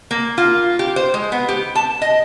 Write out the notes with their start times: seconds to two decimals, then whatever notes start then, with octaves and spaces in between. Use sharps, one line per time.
0.11 A#3
0.38 F4
0.79 G4
0.96 C5
1.14 G#3
1.32 B3
1.49 G4
1.75 A5
2.02 D#5